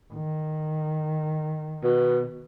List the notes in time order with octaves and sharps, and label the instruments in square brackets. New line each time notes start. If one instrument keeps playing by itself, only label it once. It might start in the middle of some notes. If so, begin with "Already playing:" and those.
[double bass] D#3
[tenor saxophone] B2